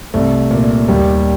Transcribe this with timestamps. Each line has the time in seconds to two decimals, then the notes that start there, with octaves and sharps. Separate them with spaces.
0.14 C2 A3
0.50 A#2
0.88 D#2 G3